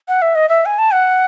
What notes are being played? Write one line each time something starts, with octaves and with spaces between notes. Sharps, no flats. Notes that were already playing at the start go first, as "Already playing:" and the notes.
F#5
E5
D#5
E5
G#5
A5
F#5